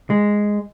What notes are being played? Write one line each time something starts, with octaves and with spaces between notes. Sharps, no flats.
G#3